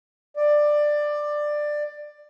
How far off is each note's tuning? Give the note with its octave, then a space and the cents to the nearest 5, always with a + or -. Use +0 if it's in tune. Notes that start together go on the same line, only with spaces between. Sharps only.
D5 +15